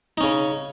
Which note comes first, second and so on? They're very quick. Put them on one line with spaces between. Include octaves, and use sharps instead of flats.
D#4 C#4 C#3